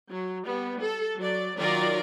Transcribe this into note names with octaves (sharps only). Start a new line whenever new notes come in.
F#3
G3 B3
A4
F#3 D5
D#3 F#3 F4 A#4 D5